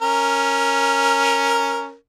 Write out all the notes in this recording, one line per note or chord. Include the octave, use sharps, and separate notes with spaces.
C#4 A#4